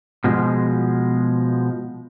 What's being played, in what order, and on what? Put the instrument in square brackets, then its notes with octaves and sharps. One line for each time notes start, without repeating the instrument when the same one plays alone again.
[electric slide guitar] B2 F3 G#3